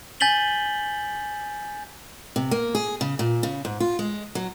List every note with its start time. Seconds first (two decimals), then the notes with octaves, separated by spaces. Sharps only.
0.20 G#5 G6 A6 B6 F#7 G7
2.36 C3
2.51 A#3
2.75 G#4
3.01 C#3
3.19 A#2
3.43 C#3
3.65 G#2
3.80 F4
3.99 G#3
4.35 F#3